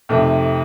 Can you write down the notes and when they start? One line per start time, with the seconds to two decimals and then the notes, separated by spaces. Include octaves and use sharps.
0.09 F2 C3 D#3 A3